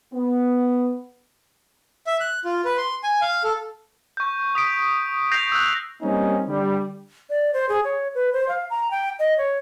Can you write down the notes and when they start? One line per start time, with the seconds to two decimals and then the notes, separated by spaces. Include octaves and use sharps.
0.14 B3
2.07 E5
2.20 F#6
2.45 F4
2.65 B4
2.78 C6
3.03 G#5
3.21 F5
3.44 A4
4.17 C#6 G6
4.55 D#6 B6 D7
5.32 G6 A#6 C7 D7 F7
5.52 E6 F#6
6.02 G3 A#3 C4 C#4 D#4
6.47 D3 G3
7.30 D5
7.54 C5
7.69 G#4
7.85 C#5
8.15 B4
8.33 C5
8.48 F5
8.70 A#5
8.91 G5
9.19 D#5
9.38 C#5